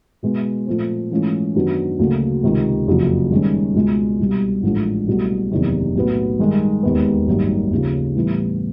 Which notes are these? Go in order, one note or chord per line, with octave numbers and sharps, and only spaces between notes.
B2 G#3 B3
A#2 F3 A3 C4
G#2 E3 A3 C#4 F4
F#2 D#3 F#3 B3 D4
D2 C#3 F#3 A#3
C#2 C3 D#3
F#1 F2 C#3 F#3
G2 D#3 G#3 C#4
C#2 B2 G#3
C2 B2 G3
A1 G#2 F3 A3 D4
C2 B2 F#3 A3
F#1 E2 C3 D#3
B1 A2 F#3 B3
G2 D#3 G#3
E1 D#2 D#3 G#3 B3
G#1 F#2 D#3 G3 A#3
D#2 C#3 F3
A2 E3 G3 B3 E4